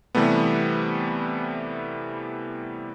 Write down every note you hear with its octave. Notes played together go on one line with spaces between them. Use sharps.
C3 E3 G3 A3 B3